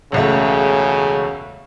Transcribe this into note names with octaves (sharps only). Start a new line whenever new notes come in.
E1 C#2 C#3 A3